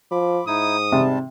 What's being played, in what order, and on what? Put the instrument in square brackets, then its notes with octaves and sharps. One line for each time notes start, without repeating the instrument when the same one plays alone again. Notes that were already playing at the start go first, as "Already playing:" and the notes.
[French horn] F3 [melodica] B5 D6
[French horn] G#2 [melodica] D#4 E4 [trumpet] D#6
[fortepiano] C3 [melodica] G3 A5